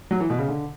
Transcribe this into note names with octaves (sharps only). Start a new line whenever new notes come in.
F#3
E3
B2
C#3
D3